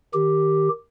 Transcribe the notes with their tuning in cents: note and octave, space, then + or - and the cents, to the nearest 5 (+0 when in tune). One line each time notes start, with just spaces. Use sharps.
D#3 +0 G4 +0